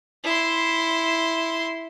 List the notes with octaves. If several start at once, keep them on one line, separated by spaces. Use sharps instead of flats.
E4 C6